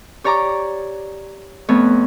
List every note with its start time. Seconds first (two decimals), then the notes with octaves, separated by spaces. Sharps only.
0.24 G4 C#5 D5 A#5 C#6 D6
1.69 F2 A3 B3 F4 C#5